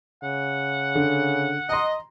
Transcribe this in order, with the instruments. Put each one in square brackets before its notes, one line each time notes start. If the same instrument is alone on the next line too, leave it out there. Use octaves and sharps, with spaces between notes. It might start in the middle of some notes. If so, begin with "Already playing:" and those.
[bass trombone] C#3 [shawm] F#5
[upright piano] D3
[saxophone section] D#5 [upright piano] A#5 C6